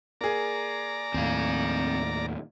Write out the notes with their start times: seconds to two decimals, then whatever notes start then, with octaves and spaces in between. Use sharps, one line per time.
0.21 A#3 G#4 D5 A#5
1.14 D#2 A2 C4 F5